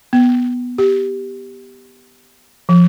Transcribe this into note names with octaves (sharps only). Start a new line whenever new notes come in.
B3
G4
F3